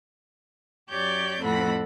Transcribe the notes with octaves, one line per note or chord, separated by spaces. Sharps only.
F#2 G4 C#5 D5 G6
F2 A2 C4 A4 F#5 B5